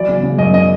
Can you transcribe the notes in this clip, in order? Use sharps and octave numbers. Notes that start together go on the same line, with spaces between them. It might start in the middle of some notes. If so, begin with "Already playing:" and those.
Already playing: E3 F#3 D5
C#3
C#3
F#2 D#5
C#3 D#5